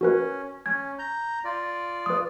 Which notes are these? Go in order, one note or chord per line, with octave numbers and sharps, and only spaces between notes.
C#4 F#4 A#4 B4
C#4 G#6
A#5 G6
F4 D5
B4 D#6